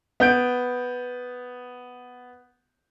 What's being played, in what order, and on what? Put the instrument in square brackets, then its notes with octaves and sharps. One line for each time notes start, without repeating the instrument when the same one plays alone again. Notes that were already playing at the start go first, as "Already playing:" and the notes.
[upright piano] B3 G6 D7